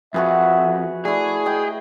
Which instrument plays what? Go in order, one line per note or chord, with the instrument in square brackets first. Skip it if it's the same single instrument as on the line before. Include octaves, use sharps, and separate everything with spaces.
[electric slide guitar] F2 [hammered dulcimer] F#4 G#4 B4 [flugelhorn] E5
[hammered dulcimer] A3 E4 [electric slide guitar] G#4 [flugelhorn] D5
[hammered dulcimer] D#5 G5